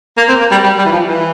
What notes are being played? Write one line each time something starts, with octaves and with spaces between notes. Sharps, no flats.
A#3
C4
A#3
G3
G3
G3
E3
F3
E3